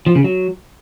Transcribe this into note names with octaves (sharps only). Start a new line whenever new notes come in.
F3
C#3
F#3